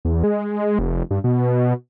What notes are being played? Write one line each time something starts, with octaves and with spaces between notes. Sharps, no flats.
E2
G#3
F1
G2
B2